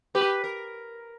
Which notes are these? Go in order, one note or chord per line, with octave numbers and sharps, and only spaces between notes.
G4 B4
A#4